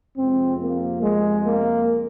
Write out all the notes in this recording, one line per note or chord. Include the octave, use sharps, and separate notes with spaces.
F2 C3 F3 G#3 C4
A#3
G#3
A#3